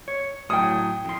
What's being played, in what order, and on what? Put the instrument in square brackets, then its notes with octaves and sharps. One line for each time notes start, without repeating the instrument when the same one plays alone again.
[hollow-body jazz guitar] C#5
[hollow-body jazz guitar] A2 F#3 [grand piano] G5 D#6
[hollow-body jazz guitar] F2 C6